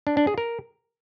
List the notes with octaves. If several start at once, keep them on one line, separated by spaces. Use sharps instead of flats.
D4
D4
G#4
A#4